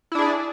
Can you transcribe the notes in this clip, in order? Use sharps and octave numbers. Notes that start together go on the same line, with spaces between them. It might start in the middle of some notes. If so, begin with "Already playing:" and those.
D4 E4 G#4 D5